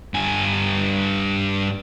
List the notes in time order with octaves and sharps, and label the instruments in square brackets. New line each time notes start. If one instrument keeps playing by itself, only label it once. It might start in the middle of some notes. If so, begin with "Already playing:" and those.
[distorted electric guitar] G2 G#5